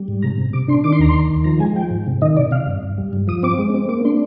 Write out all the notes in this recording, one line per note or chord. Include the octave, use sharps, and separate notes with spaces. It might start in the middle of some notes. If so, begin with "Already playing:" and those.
Already playing: G3
G#2
C3 A#5
C3
C3 D6
D4 C6
D#3 D6
C6
D#2 A#5
C6
D#3
D#3
F3 A#5
G#3 G#5
F3 G5
G#2
C3
D#3 D#5
C3 D5
C3 F5
G2
G2
G3
G2
F3 D#6
C4 D6
G#3
C4
A#3 D6
D4 C6